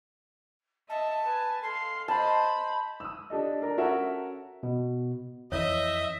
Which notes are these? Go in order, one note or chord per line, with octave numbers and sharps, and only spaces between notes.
D#5 E5 A5
B4 G#5
A4 F5 C6
C5 D#5 A5 B5
D#6 E6
D4 G4 A4 D#5
D4 A#4 A#5
C#4 F#4 A4 A#4 E5
B2
F2 E3 C#5 D#5 E5